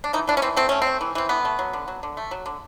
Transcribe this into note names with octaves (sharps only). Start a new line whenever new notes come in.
D4
E3 D#4
E3 D4
C#4
E3 C4
A3 C4
A3 C#4
C4
A3
E3
E3 C4
D3 B3
A3
F#3
D3
F#3
D3
A3
F#3
D3